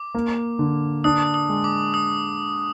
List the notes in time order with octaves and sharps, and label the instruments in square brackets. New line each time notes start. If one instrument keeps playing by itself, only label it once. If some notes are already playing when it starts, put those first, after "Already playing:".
Already playing: [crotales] D6
[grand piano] A#3
D3
[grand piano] D4 [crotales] D#6
[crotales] D#6
[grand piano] G#3
[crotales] D6
D#6